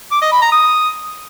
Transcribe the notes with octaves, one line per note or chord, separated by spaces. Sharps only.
D6
D#5
B5
A#5
D#6